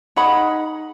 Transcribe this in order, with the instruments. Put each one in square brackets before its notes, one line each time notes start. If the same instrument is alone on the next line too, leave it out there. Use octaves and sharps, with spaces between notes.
[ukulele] D#4 G#4 F#5 B5